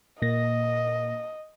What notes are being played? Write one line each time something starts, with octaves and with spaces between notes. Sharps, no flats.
A#2 A#3 D#5 A#6